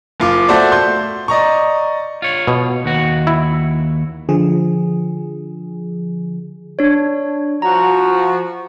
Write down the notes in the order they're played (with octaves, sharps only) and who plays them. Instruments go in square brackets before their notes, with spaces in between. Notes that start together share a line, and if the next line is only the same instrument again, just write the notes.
[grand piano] F#1 F4 D6
A3 F#4 A4 C5 D5
C6 G6
D5 D#5 A#5 C#6
[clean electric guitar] F4 C#5
[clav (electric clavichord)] B2
[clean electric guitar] D#2 F#4
[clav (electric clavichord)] E4
[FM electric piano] D3 F3 G#4
[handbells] D4 C#5
[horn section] F3 F#4 [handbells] A#5